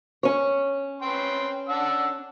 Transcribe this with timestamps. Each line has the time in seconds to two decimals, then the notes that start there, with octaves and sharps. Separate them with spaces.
0.23 C#4 C#5
1.02 B4 G5 C6
1.69 D4 F#5 E6